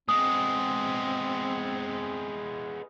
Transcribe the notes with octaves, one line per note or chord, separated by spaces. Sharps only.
G#3 B3 C4 D#6